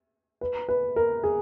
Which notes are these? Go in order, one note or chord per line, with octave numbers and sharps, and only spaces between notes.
B4
B4
A#4
G#4